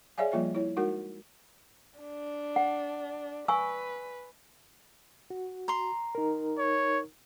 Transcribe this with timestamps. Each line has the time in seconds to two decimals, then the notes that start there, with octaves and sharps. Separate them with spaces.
0.18 G#4 C#5 D5 E5 F5 G#5
0.32 F3 G3 A#3 F4 C#5 E5
0.55 E4 C#5
0.77 G#3 D#4 F#4 A#4 F#5
1.99 D4
2.56 F#5
3.48 B4 G#5 C#6 E6
5.30 F#4
5.68 A#5 C6
6.15 D#4 A#4
6.59 C#5